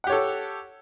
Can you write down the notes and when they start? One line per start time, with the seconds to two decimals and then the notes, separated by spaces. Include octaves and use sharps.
0.04 F#5
0.07 G4
0.10 C#5
0.12 A4